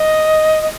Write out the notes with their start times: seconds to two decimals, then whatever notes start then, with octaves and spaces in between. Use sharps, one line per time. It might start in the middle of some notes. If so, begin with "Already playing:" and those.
Already playing: D#5
0.61 D#5